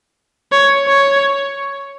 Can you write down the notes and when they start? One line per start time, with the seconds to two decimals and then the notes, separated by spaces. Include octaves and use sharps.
0.52 C#5
0.87 C#5